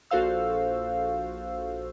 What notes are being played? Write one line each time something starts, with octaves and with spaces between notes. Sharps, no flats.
A#1 F#4 A4 C5 F5 E6